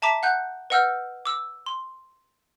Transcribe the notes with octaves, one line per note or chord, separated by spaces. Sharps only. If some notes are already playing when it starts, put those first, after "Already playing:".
E5 A5 A#5 D6 B6
F#5 F#6 G6
B4 D#5 F#5 E6 F6 G6
D6 E6
C6